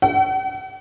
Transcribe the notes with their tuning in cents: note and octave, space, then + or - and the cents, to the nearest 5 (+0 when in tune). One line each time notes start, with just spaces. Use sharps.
F#5 +45